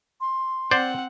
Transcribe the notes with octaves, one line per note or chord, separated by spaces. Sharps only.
C6
C4 C5 D5 F#5